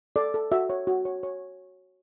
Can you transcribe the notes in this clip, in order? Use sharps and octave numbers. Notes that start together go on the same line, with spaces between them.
A4 D5
A4
F#4 E5
C#5
F#4
C#5
C#5